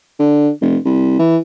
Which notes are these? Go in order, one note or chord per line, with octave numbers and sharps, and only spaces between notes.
D3
F1
C2
E3